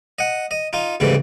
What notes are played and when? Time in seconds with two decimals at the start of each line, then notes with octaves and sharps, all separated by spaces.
0.19 D#5 F#5
0.51 D#5
0.73 D#4 F4
1.00 D2 G#2 C#3 E3 G3